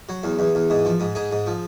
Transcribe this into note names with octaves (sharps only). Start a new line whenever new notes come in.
F#3
E2
E2
E2
G#2
F3
G#2
G#2 G#4
G#2
F3